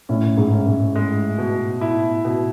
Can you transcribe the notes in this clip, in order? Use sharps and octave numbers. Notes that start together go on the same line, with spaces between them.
A2 C#4
G#2
C#4
G#2
G#3
B2
E4
B2